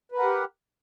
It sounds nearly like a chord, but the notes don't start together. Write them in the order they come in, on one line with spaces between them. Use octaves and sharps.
B4 A#4 F#5 G4